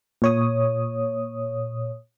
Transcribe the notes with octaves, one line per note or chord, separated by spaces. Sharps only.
A#2 C#5 D#6